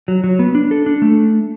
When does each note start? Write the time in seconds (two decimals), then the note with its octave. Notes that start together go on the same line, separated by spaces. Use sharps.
0.08 F#3
0.24 F#3
0.39 B3
0.55 D4
0.71 A4
0.86 D4
1.02 A3